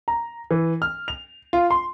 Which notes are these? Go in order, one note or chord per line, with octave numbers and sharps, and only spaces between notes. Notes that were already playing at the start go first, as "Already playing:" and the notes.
A#5
E3
F6
F7
F4
C6